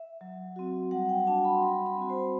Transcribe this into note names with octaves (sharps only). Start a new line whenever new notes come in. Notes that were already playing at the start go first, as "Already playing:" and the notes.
Already playing: E5
F#3
C4 F#4
G3 F#5
G5
D4 F#4 A5
B5
C6
G3 B5
B5
C4 F#4
C5